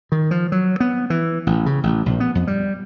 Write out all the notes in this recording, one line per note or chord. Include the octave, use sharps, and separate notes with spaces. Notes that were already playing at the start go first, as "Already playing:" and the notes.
D#3
F3
F#3
B3
E3
A1
C#3
A1
A#1
B3
F2
G3